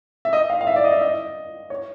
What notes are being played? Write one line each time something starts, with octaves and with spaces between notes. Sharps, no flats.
E5
D#5
F5
F5
E5
D5
D#5
E5
D#5
C#5